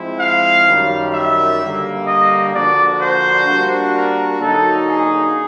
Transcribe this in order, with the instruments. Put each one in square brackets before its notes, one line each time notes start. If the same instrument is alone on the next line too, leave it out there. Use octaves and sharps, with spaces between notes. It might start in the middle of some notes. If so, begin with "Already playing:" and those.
Already playing: [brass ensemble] F3 G#3 C4 E4
[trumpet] F5
[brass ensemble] F#2 D#3 G3
[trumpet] E5
[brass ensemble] D3 G3 A#3
[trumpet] D#5
[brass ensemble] D3 F3 A#3 D4 F#4 [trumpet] D5
[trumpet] C5
[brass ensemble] G3 A#3 D4 F#4
[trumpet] A#4
[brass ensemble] D3 F#3 A#3 D#4 F#4 [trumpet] A4
[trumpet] G#4